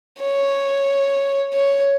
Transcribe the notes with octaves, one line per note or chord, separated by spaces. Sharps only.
C#5
C#5